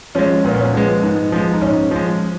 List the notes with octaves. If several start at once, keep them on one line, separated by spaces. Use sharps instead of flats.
F3 G#3 C#4
A#2 B3
C#4
B3
F3 G#3
G#2
F3 G#3
D#4
G#2 C#4
F3 G#3